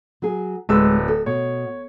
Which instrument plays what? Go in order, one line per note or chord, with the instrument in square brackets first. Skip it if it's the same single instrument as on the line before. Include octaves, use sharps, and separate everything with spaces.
[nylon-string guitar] F#3 G#4
[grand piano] D1 B4 E6 [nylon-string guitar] G#3
[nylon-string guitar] A4
[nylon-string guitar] B2 [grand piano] C#5